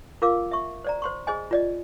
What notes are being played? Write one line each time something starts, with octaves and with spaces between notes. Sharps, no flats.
F4 A#4 F5 D6 E6
E5 C#6
C5 D5 A#5
C5 C6 C#6
G#4 C5 D#5 G#5
F4 D5 D#5